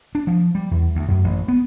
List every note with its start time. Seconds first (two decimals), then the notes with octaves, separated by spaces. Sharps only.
0.15 D4
0.27 F3
0.55 G3
0.71 E2
0.95 D2
1.08 F#2
1.24 A1
1.48 B3